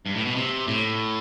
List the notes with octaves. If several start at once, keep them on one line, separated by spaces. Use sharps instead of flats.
G2
A2
B2
C3
A2